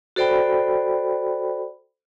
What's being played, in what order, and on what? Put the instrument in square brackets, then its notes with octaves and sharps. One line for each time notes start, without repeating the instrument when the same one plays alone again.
[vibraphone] F#4 A4 C5 D5 G5 B5